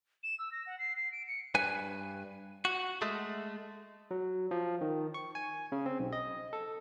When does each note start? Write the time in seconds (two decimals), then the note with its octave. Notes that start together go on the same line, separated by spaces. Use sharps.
0.23 E7
0.39 E6
0.51 A#6
0.66 F#5
0.79 C7
0.96 C7
1.12 D7
1.27 C#7
1.55 G2 B4 G#5
2.65 F#4
3.02 G#3 A3
4.11 F#3
4.51 F3
4.81 D#3
5.14 C#6
5.35 G#5
5.72 C#3
5.86 C4
5.99 B1
6.13 D#5
6.53 A4